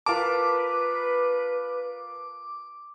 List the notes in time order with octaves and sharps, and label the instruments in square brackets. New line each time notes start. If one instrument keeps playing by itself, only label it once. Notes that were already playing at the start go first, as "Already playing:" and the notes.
[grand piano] F4 A#4 A5 [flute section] B4 [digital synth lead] D6